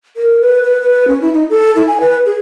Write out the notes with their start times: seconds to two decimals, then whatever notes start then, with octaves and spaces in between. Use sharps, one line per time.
0.17 A#4
0.41 B4
0.63 B4
0.82 B4
1.08 C#4
1.21 E4
1.34 D#4
1.50 A4
1.76 E4
1.87 G#5
2.01 B4
2.26 G#4